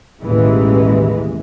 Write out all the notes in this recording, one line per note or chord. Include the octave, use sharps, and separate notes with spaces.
A1 D#2 B2 E3 G#3